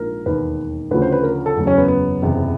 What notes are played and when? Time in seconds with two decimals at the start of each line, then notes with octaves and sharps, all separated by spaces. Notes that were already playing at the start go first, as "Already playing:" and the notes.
Already playing: A#1 G#2 F3 A#4
0.25 E1 D#2 D#3 B4
0.91 D2 C#3 F3 B4
1.02 C5
1.12 B4
1.23 A#4
1.46 A4
1.56 F#1 E2 C#3 F#3
1.67 C#4
1.77 B3
1.88 B3
2.22 F#1 E2 C3